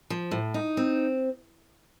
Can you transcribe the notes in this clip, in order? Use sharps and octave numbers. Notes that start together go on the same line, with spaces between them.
F3
A2
D#4
C4